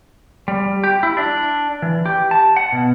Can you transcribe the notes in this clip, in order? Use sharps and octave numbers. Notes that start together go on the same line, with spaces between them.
G3
G4
E4
D4
E3
G4
A5
F#5
B2